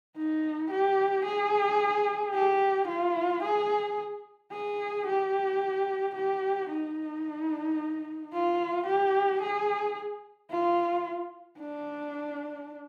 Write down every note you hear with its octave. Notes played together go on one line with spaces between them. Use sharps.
D#4
G4
G#4
G4
F4
G#4
G#4
G4
G4
D#4
F4
G4
G#4
F4
D4